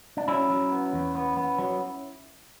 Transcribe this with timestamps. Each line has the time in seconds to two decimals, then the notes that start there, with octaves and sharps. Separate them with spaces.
0.17 D4
0.28 F#3 C#4 E4
0.50 F#3
0.72 B3
0.93 E2
1.15 B3
1.37 B3
1.58 F#3